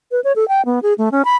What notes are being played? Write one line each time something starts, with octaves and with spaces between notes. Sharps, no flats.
B4
C#5
A4
G5
B3
G#4
A3
C#4
B5